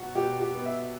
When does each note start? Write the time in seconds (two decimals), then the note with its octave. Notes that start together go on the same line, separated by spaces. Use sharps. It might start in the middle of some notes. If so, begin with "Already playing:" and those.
Already playing: B2 F#3 F#4
0.15 B2 G4
0.40 G4
0.54 B3
0.65 E5